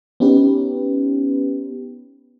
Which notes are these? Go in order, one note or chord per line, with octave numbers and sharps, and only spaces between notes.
B3 C#4 D#4 G4 B4